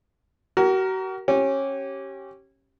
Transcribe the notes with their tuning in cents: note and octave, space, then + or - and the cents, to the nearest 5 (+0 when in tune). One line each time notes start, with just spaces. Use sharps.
F#4 +40 A#4 +0
C#4 -20 G4 -20